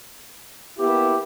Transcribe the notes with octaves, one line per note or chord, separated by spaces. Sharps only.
A#3 B3 E4 G4